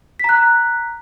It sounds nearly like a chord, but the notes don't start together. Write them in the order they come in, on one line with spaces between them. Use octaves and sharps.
B6 A#5 F#6